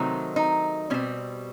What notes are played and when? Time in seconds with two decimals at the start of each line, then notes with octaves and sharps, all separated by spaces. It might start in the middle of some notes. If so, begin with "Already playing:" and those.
Already playing: C3 D#3 F#3 A3 C4 D#4
0.36 D#4
0.90 B2 G3 C4 C#4